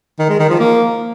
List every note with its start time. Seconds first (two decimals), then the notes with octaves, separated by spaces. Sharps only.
0.19 D#3
0.29 G#3
0.40 D#3
0.50 F3
0.60 A#3